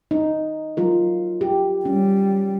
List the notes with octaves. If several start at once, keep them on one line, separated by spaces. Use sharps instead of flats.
D#4
F#3 F4 A#4
G4
G3 C#4